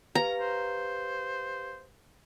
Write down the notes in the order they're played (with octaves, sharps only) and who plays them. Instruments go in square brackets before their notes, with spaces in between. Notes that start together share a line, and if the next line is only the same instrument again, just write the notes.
[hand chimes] G4 B4 F5 [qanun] A#5
[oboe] C5